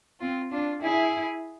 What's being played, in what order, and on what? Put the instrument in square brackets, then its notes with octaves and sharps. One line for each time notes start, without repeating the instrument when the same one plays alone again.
[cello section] C4 [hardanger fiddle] F4
[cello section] D4 [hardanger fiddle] F4
[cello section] E4 [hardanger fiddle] G#4